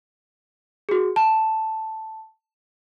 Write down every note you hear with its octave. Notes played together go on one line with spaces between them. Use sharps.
F#4 G#4
A5